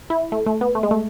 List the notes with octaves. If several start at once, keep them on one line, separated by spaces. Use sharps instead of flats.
E4
A3
A3
B3
A3
G#3
A3